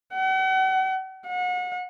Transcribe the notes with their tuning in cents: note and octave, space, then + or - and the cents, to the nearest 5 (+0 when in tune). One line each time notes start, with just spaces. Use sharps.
F#5 +40
F#5 -35